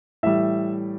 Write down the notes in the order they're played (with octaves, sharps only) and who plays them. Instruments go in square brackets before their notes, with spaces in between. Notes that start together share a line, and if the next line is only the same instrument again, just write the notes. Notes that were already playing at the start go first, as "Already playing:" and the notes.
[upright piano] A2 E3 G3 E5